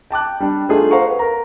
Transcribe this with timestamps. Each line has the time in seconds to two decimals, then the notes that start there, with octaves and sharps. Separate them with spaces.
0.11 G5 A5 D6 F#6
0.40 G3 D4
0.69 A3 D4 D#4 F4 G#4
0.91 C5 F5 F#5 A#5 C#6
1.06 B4
1.19 A#4 A#5